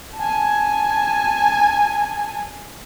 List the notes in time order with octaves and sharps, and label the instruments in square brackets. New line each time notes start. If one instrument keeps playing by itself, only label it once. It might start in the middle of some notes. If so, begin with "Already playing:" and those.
[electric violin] G#5 A5